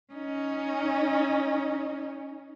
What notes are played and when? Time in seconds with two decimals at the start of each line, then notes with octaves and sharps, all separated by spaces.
0.13 C#4 D#4